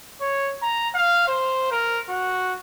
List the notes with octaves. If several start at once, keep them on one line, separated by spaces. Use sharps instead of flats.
C#5
A#5
F5
C5
A#4
F#4